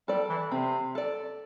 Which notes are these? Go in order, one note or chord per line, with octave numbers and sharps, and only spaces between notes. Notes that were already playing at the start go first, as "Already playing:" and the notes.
G3 A4 D5
E3
C3 C4
A4 D5